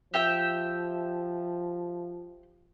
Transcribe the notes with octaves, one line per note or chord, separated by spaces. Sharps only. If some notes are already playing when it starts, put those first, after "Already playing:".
F3 G4 E5 G5